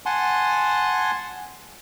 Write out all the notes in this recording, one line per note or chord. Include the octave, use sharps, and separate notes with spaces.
F#5 G#5 A5 C6